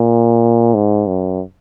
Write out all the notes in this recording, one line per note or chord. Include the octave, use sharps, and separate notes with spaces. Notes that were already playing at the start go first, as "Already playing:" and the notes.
Already playing: A#2
G#2
F#2